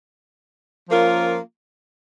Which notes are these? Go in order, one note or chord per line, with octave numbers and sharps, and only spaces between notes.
F3 A#3 C#4 F4 A#4